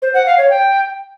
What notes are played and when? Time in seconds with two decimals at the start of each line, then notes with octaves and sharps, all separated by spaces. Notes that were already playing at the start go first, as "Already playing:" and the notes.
0.02 C5
0.14 F#5
0.26 F5
0.38 C#5
0.50 G5